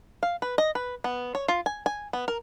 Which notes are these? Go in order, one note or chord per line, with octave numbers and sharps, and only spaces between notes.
F5
B4
D#5
B4
B3
C#5
F4
G#5
G#5
B3
A#4